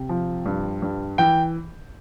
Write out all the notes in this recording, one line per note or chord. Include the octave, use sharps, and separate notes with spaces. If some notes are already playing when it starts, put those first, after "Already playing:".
Already playing: C3
F3
G2
G2
E3 G5